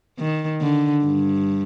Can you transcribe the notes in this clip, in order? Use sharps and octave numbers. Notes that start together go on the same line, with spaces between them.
D#3
D3
G2